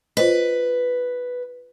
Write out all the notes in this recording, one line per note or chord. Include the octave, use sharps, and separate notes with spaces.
F4 B4 C5 D#5